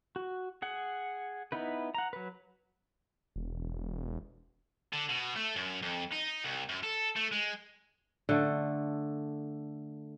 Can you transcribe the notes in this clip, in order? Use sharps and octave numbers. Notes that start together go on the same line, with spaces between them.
F#4
G#4 F#5
B3 D#4 E4 B4
F#5 A#5
F#3 B4
E1
D3
B2
A3
F#2
F2
D#4
C2
F#2
A4
A3
G#3
D3 A3